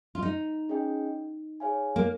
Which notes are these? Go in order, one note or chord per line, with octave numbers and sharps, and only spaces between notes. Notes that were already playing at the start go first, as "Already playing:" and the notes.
F4
D#4
C#4 G#4 D#5 G5
G#4 C#5 F5 G#5
A#3